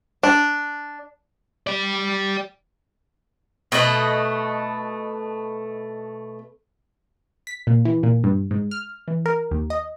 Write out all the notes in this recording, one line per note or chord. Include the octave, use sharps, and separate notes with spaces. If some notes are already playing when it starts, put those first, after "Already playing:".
D4
G4 D5
B2 A3 B4 D#5
B6
A#2
E3
A#2
G2
G#2
F6
E3
A#4
D#2
D#5